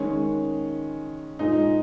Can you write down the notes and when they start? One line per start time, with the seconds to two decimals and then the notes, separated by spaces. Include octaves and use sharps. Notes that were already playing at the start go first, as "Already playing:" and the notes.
Already playing: D#3 G#3 C#4
1.39 A#2 G#3 D#4